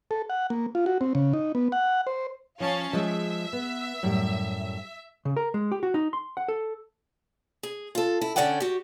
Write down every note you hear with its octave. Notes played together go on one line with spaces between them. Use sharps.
A4
F#5
A#3
F4
F#4
C4
C#3
D#4
B3
F#5
C5
F3 C#4 F5 A5
F3 G#3 E5
B3
F#2 A2 G3
C#3
A#4
G#3
G4
F#4
D#4
C6
F#5
A4
G#4
F4 A4
E4
D3 C#4 G#4 D5 F#5 G5
F#4 G4